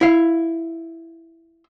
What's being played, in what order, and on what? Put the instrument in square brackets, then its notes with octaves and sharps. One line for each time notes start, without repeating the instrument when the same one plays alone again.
[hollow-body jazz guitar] E4 F5